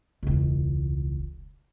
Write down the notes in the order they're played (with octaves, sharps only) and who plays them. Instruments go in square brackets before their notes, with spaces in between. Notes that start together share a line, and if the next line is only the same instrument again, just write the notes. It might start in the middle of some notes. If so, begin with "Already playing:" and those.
[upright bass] E1 C#2